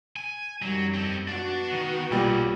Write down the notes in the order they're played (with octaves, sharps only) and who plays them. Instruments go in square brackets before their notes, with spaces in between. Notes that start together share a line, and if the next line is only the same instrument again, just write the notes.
[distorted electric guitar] G#5
[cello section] F#2 D#3 G3 [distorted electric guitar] F#3
[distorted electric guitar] C4 A4
[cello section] B3 F#4 [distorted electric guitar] D4
[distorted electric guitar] D#3
[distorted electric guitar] B1 [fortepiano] A#2 G3